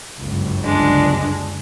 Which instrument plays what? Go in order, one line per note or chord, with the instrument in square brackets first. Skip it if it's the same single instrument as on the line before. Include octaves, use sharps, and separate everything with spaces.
[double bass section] G1 C#2 F#2
[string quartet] D3 G#3 D4